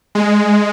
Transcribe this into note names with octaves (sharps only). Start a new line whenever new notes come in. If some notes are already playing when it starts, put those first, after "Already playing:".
G#3